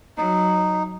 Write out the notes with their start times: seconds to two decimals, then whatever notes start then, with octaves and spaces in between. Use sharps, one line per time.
0.17 F#3 D#4